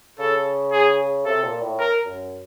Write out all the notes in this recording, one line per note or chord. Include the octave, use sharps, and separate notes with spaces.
C#3 A4
G#4
C3 A4
A#2
A2
A#4
F#2